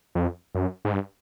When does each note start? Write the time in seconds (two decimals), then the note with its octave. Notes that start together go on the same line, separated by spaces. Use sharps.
0.15 F2
0.55 F#2
0.85 G#2
0.93 G2